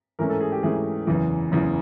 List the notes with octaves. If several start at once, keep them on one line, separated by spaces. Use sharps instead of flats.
G#2 E3 A3 C#4 A#4
A4
G#4
G4
G#2 E3 A3 C#4 G#4
F#1 E2 C#3 E3
F#1 E2 C#3 E3